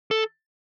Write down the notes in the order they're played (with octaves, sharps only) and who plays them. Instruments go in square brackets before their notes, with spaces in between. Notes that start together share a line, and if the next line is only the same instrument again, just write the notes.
[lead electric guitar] A4